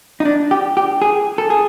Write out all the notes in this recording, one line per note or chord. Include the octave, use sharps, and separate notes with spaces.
D#4
D4
G4
G4
G#4
A4
G#4